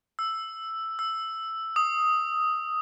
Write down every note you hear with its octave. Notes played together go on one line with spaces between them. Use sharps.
E6
E6
D#6